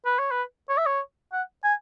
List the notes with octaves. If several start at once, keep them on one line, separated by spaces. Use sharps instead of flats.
B4
C#5
B4
C#5
E5
C#5
F#5
G#5